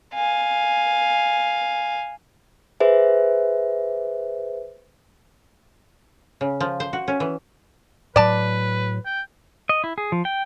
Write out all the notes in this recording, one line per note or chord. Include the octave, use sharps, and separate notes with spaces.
F5 G#5
G#4 B4 C5 E5
C#3
F3
C5
F#4
C#4
E3
A2 F#3 B4 D5 A5
G5
D#5
E4
G#4
F3
G5